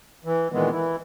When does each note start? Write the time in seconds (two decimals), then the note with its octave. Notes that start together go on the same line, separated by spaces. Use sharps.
0.25 E3
0.52 A#2 D#3 E3 G#3 B3
0.71 E3 E4